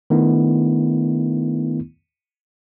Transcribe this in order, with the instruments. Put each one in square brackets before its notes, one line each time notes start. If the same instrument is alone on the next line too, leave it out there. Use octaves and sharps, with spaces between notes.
[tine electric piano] D#3 A3 B3 D4 E4